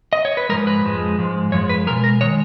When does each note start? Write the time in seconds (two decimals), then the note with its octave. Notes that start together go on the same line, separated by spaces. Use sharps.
0.13 D#5
0.25 C#5
0.37 B4
0.49 G#2 F3 G#3 A#4
0.67 B4
0.84 F2 F3 G#3
1.19 G#2 F3 G#3
1.52 F#2 F3 G#3 C#5
1.69 B4
1.87 B2 G#3 A#4
2.04 A#4
2.21 D#3 G#3 C#5